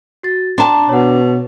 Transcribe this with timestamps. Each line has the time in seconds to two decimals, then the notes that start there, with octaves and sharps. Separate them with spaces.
0.23 F#4 A6
0.58 D4 G5 A5 A#5 C6
0.89 B2 C#5 F#5